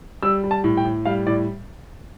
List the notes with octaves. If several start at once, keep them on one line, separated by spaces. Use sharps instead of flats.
G3 E6
G3
A5
A2
G5
A2
G3 F5
A2 D5